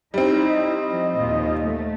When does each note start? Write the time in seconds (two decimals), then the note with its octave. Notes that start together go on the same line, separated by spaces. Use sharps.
0.14 G3 C4 D#4 E4
0.46 D#5
0.89 F3
1.19 D#2 A#2 F4
1.63 A3